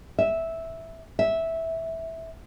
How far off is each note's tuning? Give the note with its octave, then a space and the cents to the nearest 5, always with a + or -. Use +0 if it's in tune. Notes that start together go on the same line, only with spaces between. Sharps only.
E5 -5
E5 -10